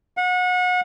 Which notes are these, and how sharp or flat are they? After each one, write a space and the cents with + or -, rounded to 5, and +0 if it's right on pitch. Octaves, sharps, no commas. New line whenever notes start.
F#5 -30